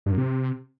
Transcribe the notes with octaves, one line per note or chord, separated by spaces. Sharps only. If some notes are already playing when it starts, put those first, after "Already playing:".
G2
F#2
C3